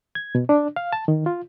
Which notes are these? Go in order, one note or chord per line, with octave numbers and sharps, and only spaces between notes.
G#6
B2
D4
F5
A5
D#3
F4